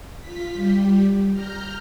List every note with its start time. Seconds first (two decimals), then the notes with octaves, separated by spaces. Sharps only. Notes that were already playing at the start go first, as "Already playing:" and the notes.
0.20 F4 B6
0.53 G3 G4
1.32 A#5 F6 G6